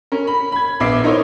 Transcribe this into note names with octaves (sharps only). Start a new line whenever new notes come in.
C#4 A#4
B5
B5 G#6
A#1 B3 E5 D6 C7
D#4 E4 A#4 C5 C#5 D#5